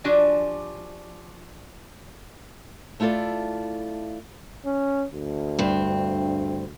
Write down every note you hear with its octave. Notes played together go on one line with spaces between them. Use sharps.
F3 D4 F#4 G4 D5 G#5
A3 E4 F4 A4 D5
C#4
D2
G2 C4